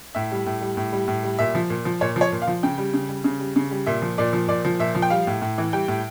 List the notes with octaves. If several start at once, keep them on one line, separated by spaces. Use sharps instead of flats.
A2 E5
G3
A2
G3
A2
G3
A2
G3
A#2 E5
F3
A#2
F3
A#2 C#5
F3
C#5
A#2
F5
F3
C#3 G5
G3
C#3
G3
C#3
G3
C#3
G3
A#2 E5
F3
A#2 D5
F3
A#2 D5
F3
A#2 E5
F3
G5
G3 F5
A2
A2
E3
G3 G5
A2